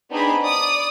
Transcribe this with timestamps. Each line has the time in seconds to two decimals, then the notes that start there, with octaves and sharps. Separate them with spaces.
0.10 B3 C4 D4 D#4 G#4 B5
0.41 D5 D#6